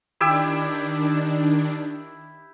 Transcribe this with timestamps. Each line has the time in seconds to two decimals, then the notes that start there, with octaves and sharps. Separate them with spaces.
0.21 D#3 D4 E4 G4 E6